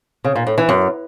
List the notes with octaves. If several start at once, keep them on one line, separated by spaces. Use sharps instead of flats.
C#3
A#2
A2
E3
F#2